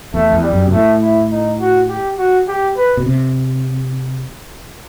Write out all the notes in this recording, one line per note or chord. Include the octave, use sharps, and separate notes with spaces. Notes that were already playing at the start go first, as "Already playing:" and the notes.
E2 A3
E2
G3
F#2
B2
A2 A3
E4
D#4
F#4
G4
F#4
G4
B4
B2
C3